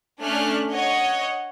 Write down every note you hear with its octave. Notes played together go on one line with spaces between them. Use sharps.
A3 C#4 D4 F6 F#6
C#5 D#5 F#5